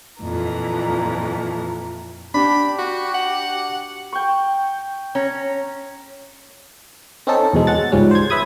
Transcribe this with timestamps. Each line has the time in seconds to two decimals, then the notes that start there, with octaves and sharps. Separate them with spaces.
0.22 F2 A#2 E3 A#5
2.34 D4 G4 B5
2.79 F#4
3.14 F#5
4.13 G5 C#6
5.15 C#4 A#5
7.27 C4 C#4 D#4 A4
7.53 E2 B2 G#3
7.67 G#3 F#5 A6
7.92 C#2 G#2 F3 G3 C#4
8.11 C5 G#6
8.30 B4 E5 B5 D#6 G#6